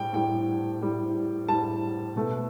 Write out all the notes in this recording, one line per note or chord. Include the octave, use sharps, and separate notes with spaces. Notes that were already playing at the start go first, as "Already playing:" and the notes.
Already playing: A2 G3 G5
A2 G3 G5
A2 G3
A2 G3 A5
B2 A3